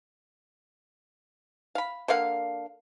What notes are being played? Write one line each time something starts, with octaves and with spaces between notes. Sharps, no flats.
F5 B5
D3 A#3 F5 F#5